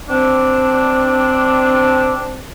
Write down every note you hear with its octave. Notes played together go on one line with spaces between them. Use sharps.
C4 D4